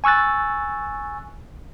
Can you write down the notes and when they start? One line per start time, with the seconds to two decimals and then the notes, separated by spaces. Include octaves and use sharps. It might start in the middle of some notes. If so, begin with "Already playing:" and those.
0.04 G#5 C#6 E6 F#6 A6